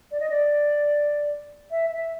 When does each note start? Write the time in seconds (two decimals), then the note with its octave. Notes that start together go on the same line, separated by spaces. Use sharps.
0.11 D5
0.20 D#5
0.30 D5
1.71 E5
1.92 E5